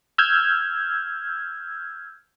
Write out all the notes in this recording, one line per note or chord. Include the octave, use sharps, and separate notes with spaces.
E6 F6 G6 G#6